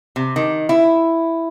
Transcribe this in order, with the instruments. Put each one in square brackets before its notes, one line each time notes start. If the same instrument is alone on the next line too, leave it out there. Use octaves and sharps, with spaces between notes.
[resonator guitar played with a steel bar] C3
D#3
E4